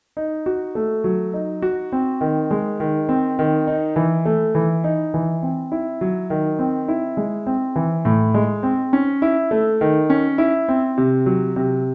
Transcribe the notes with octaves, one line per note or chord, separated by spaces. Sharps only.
D#4
F#4
A3
F#3
D#4
F#4
C4
D#3
G#3
D#3
C4
D#3
D#4
E3
A3
E3
D#4
E3
C4
E4
F#3
D#3
C4
E4
G#3
C4
E3
A2
G#3
C4
C#4
E4
A3
D#3
C#4
E4
C4
C3
F#3
C3